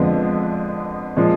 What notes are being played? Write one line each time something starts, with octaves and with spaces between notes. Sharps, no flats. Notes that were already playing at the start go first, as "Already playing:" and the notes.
Already playing: F2 D3 F3 G#3 B3
A#2 F3 G#3